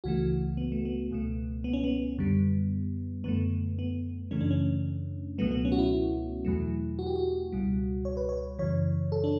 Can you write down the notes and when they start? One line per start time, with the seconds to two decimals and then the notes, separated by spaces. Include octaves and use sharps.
0.04 C#2 C#3 E3 A3 F#4
0.57 B3
0.72 A3
0.85 B3
1.11 C#2 B2 A3
1.64 B3
1.73 C#4
1.84 B3
2.18 F#2 D3 G3
3.24 F#2 D3 A3 B3
3.79 B3
4.31 F#2 C#3 E3 A3 C#4
4.41 D4
4.50 C#4
5.38 C#2 B2 F#3 A3 B3
5.51 B3
5.65 C#4
5.72 F#4
5.78 E4
6.45 E2 B2 F#3 A3
6.99 F#4
7.07 G4
7.16 F#4
7.52 C#2 B2 G3
8.05 C#5
8.17 B4
8.29 C#5
8.59 F#2 C#3 E3 C#5
9.12 A4
9.24 D4